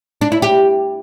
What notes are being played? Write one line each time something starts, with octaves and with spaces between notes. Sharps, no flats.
D4
E4
G4